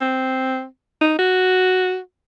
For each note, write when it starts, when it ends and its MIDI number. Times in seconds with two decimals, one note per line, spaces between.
0.01 0.65 60
1.01 1.17 63
1.19 1.98 66